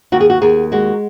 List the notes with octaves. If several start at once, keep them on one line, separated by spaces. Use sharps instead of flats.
D#2 F#4
G#4
F#4
D#2 G#4
G#3 F#4